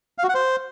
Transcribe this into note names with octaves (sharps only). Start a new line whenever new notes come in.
F5
F#4
F#5
C5